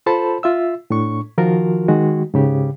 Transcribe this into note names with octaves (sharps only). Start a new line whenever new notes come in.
F4 A4 C5 A5 B5
F4 E5 E6
A2 D4 C#6
D#3 F3 F4 F#4 A#4
D#3 G#3 F#4
G#2 C#3 G4